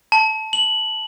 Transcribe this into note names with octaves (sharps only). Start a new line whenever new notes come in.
A5
F#7